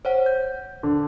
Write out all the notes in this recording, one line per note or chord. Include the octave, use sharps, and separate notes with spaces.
C5 C#5 F#5
G6
D3